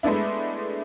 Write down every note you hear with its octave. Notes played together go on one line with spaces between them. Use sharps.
G#3 A3 B3 D4 E4